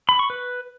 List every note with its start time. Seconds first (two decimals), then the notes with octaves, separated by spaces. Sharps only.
0.09 B5
0.19 C#6
0.30 B4